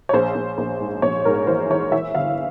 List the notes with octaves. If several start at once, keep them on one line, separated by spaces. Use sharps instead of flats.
C#5
A#1 C5
A#1
A#1
G#2
A#1 C#5
G#2 A#4
E3 C5
E3 C#5
E3 E5
G1 F5